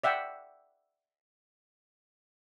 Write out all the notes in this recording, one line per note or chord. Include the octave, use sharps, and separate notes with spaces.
D5 E5 F#5 G5